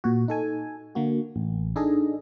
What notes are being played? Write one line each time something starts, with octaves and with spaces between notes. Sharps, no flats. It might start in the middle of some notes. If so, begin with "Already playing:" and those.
A#2 F#4
D#4 A4 G#5
D3 A#3 F#4
A1
D4 D#4 G#4 A4 D#5